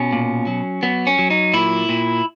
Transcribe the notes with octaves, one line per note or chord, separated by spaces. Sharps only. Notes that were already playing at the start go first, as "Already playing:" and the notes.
Already playing: B2 C#4
A#2
F#3
F#3 B3
C#4
F#3
D#4
A#2 E4
A#2